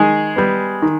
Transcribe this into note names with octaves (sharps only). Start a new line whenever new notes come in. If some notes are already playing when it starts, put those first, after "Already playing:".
Already playing: D#3 G#3 G#4
G3 B3
D#3